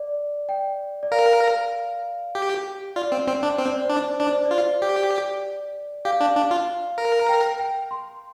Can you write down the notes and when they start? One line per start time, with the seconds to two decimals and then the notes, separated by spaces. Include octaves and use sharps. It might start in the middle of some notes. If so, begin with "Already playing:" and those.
Already playing: D5
0.49 G5
1.03 D5
1.11 A#4 F5
2.35 G4
2.96 F4 D5
3.12 C4
3.28 C4
3.43 D4
3.58 C4 C5
3.71 D5
3.84 C5
3.90 D4
4.20 D4 D5
4.33 C5
4.45 D5
4.51 F4
4.82 G4
6.05 G4 F5
6.21 D4
6.36 D4
6.51 F4
6.98 A#4
7.20 A#5
7.29 G5
7.59 G5
7.91 C6